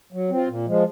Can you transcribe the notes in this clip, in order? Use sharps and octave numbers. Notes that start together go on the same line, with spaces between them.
F#3
C4 F4
A#2
F3 G#3